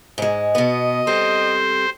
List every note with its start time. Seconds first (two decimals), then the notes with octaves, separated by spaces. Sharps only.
0.18 G#2 G#3
0.55 B2 B3 D#5
1.07 G3 C4 A4 C5